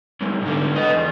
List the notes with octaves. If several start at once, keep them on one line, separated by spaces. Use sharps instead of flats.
B1 G2
G#2 D3
B4 D#5
E2